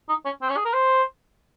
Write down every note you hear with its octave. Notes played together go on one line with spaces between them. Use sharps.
D#4
C#4
C4
C#4
G#4
A#4
C5